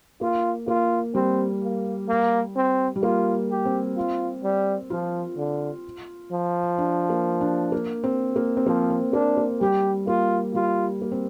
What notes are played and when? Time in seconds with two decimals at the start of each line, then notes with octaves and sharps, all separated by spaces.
0.21 A#3 F4
0.68 A#3 F4
1.15 G3 C4
1.62 A#3
2.08 A#3
2.56 C4
2.96 G3
3.02 A#3 F4
3.50 G4
3.65 C4
3.97 F4
4.43 G3
4.90 F3 F4
5.37 D3
6.32 F3
6.78 D4
7.10 A#3
7.41 D4
7.72 A#3
8.04 C4
8.36 A#3
8.57 C4
8.66 F3 A#3
8.90 C4
9.13 A#3 D4
9.37 A#3
9.61 G3 G4
10.07 A#3 F4
10.54 G3 F4
11.02 A#3
11.12 C4